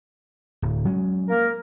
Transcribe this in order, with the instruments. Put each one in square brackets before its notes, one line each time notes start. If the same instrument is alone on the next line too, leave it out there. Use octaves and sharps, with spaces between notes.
[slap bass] D1
F#3 G#3 C#4
[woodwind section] A#3 A#4